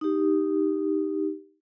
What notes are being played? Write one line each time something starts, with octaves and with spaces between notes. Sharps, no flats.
D#4 G4